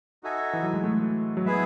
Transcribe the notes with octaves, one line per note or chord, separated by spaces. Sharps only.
D#4 F#4 A4 E5 G#5
E3
F#3
G#3
A3
F#3
G#3 B3 E4 G#4 B4 E5